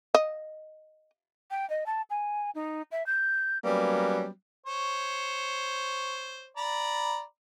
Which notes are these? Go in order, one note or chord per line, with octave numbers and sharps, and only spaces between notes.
D#5
G5
D#5
A5
G#5
D#4
E5
G6
F#3 G3 A#3 B3 C#4
C5 C#5
D5 A#5 B5